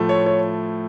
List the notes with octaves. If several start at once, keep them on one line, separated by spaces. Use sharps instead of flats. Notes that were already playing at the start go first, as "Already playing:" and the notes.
Already playing: A2 F3 A3
C#5
C#5